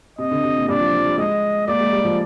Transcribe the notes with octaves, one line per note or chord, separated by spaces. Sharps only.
C3 D#5
D3
C3
A#2
G2 D5
F3
F3
G3
G#3 D#5
A#3 D5
G#3
G3
F3